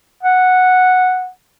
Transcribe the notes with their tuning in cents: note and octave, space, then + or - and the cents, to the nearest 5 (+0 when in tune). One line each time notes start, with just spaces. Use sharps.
F#5 -5